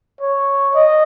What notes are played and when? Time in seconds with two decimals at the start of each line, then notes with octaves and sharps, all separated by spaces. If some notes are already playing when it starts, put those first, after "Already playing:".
0.21 C#5
0.75 D#5